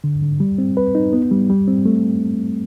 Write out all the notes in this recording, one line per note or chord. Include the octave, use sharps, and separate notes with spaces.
D3
D3
G3
C4
B4
D#4
B3
G3
G3
C4
A3